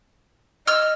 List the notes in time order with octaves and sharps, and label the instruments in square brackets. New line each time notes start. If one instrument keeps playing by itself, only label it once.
[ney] D#5 [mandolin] E6 F6